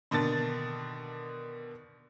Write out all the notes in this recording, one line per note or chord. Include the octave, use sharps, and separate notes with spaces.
B2 D3 D#3 A5 A6